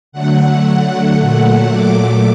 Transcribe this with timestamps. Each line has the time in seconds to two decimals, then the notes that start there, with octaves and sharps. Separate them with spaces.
0.12 D3 F#3 A3 F#5
1.18 A#2 F#3 A3 F#5
1.72 D6